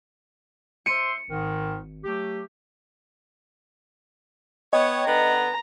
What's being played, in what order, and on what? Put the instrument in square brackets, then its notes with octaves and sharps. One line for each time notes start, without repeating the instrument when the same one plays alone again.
[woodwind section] C5 E5 C6 [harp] C#7 D#7
[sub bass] G#1 [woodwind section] G#2 D#3
[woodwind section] F#3 A3 G4
[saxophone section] B3 C#5 [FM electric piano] D#5 G5
[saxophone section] D3 B3 F#5 [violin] A#5